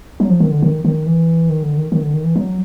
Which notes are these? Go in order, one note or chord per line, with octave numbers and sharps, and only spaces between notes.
F#3
F3
D#3
D3
D#3
D#3
E3
D#3
D3
D#3
D#3
D3
D#3
E3
F#3